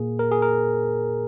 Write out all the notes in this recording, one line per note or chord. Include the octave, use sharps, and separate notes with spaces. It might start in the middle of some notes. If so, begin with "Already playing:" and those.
Already playing: A#2 A#3 G#4
A#4
G#4
A#4